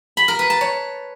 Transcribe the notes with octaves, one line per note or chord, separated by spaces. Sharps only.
B5
A#4
B4
A5
C#5